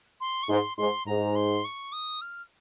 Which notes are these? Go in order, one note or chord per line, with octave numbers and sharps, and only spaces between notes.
C6
C#6
G#2 C6
G#2 C6
G#2 A#5
C6
C#6
D#6
F6